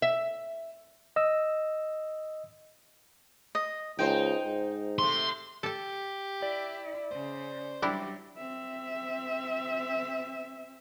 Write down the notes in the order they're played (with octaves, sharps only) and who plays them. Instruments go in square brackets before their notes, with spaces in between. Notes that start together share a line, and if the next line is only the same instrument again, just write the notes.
[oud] E5
[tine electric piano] D#5 E6
[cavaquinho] D#5
[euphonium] C#2 [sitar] D#4 C5 [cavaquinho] G5
[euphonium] G#2
[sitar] C3 A3 [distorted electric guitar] C6
[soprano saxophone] G4 [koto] A4 A5
[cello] E4 [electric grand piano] D5
[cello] C#3 [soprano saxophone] C5
[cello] F#3 G3 [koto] D4 E4 G4
[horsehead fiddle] C4 E5